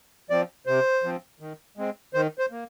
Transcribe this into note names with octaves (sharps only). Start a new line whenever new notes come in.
F3 C4 D5
C3 C5
F3 C4
D#3
G#3 C4
D#3 C5
C5
A#3